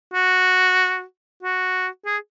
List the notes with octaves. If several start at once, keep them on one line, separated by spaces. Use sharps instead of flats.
F#4
F#4
G#4